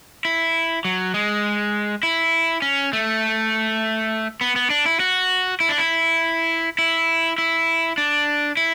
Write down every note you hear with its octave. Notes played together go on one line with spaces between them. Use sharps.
E4
F#3
G#3
E4
C#4
A3
B3
B3
D4
E4
F#4
E4
D4
E4
E4
E4
D4
E4